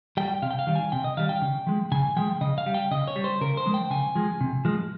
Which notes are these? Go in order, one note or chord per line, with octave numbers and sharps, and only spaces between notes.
G3 G5
C3 F5
G5
F5
D#3 G3
G#5
C3 G5
D#5
D#3 G3 F5
G5
C#3
F3 G#3
C#3 G#5
F3 G#3 G5
C#3 D#5
F5
G3
G5
C#3 D#5
C#5
G3
C5
C#3 A#4
C5
F3 G#3
G5
C#3 G#5
F3 G#3
C3
F3 G#3